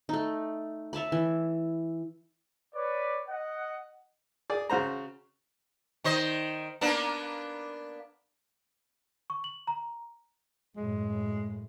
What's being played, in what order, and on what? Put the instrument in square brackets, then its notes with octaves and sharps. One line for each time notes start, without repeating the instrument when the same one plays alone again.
[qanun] A3 D#4
C#5 E5 A5 B5
E3
[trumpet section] B4 C#5 D5
D#5 F#5
[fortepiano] G#4 D5
C#3 F#4 C5 A#5
[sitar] D#3 C5 D#5
A#3 B3 D4
[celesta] C#6
F#7
A#5
[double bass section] F#2 A2 [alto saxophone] G#3